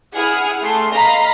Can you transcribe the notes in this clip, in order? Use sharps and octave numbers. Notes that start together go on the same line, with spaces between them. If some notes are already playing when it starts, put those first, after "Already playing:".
E4 G#4 F#5 G#5 D#6 F6
A3 C6 C7
D#5 F5 A#5 B5 A#6 B6